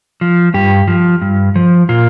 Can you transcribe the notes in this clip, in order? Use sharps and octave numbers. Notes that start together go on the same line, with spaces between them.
F3
G2 G4
F3
G2
F3
A#2 F4